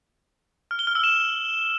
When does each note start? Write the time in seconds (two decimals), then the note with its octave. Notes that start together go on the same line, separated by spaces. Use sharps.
0.71 F6
0.79 G7
0.87 F6
0.95 E6
1.04 E7